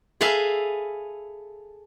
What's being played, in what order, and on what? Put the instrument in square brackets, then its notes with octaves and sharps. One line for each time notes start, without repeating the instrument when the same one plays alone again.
[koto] G#4 A4 B4 E5 F5